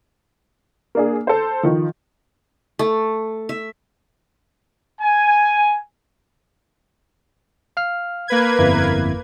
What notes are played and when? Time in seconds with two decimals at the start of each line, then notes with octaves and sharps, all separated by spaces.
0.95 A#3 D4 G#4
1.27 A4 C5
1.63 D#3 F3
2.79 A3
3.49 E5
5.01 G#5
7.77 F5 F6
8.28 A#3 B4 G#6
8.59 G1 F2 E4